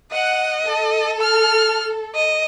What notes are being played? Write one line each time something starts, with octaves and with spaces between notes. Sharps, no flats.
D#5 F#5
A4
F6
D#5